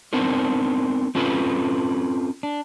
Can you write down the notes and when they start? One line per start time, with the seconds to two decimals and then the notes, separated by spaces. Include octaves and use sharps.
0.13 B3 C4 D4 D#4 A#4 C5
1.15 C4 C#4 F4 A4 B4
2.43 D4